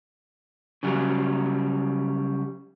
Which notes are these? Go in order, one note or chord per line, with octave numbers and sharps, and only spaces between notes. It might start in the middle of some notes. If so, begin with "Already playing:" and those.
C#3 F#3 G3